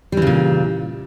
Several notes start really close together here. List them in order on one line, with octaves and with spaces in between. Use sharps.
G3 E3 C#3 A#2